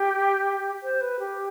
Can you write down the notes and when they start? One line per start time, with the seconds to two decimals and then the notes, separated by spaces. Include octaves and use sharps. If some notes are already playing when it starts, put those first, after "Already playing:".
Already playing: G4
0.83 C5
1.01 B4
1.19 G4